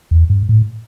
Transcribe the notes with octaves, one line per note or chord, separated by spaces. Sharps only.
E2
G2
A2